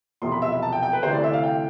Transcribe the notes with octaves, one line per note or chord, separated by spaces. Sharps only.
E1 E2 C3 F3 C6
B5
E5
E5
A5
G5
G5
B4
D2 C3 E3 C5
D5
E5
F5
G5